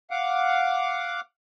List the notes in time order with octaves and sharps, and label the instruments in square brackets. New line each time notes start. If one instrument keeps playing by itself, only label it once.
[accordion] F5 F#5 D6